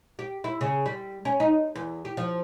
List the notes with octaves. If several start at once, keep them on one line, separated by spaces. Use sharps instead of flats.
G4
E4
C#3
G3
C#4
D#4
E2
G4
F3